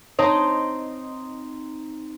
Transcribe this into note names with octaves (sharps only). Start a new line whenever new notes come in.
C4 D#4 C#5 D#5 A5